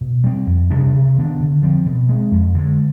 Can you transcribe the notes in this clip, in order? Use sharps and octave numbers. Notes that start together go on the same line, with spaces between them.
B2
G3 C4
F2
C3 G3 D4
C3
D#3 B3 D4
D3
F3 C4
B2
G#3 C4
F2
D3 G#3